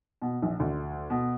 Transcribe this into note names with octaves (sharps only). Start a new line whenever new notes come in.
B2
A#1
D2
B2